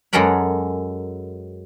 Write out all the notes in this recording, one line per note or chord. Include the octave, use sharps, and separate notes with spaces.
F#2 F#3 G#3 A4 A#4 B5